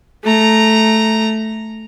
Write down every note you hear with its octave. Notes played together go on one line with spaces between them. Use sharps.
A3 A#5